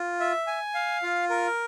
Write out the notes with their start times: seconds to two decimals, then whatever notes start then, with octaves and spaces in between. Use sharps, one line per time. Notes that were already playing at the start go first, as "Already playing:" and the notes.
Already playing: F4
0.20 E5
0.47 G#5
0.74 F5
1.03 F4
1.30 A#4